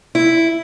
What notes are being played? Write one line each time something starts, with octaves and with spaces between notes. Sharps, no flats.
E4